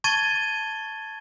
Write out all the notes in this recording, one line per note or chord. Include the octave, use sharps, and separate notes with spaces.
A5 C#6 G#6 A6 D#7 G7